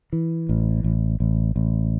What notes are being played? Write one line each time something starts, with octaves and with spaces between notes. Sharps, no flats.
E3
A1
A1
A1
A1